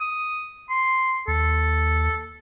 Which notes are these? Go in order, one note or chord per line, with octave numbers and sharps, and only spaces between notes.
D#6
C6
D#2 A4